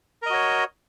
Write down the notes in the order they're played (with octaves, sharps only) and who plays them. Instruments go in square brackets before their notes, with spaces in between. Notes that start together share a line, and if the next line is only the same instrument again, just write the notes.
[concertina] A#4
D#5
F#4
C#5